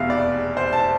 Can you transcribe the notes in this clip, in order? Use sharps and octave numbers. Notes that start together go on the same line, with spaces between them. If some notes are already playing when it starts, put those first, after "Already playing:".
Already playing: F1 E2 B2 E5 F5
D5
C5
A5